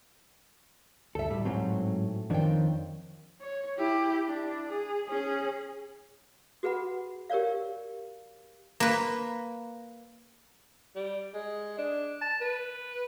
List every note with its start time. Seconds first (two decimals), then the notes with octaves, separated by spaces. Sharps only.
1.15 D2 A4 E5
1.31 A2 G3
1.45 G#2 F#3 C4
2.30 F2 D#3 D4 C5 C#5 G5
3.41 C#5
3.77 E4 G4
4.27 D4 E4
4.67 G#4
5.08 C#4 G#4
6.63 F#4 G#4 B4 F#5 B5
7.30 G4 A#4 C#5 D5 F5
8.80 A#3 B4
10.96 G3
11.34 G#3
11.78 D4
12.21 A5
12.41 B4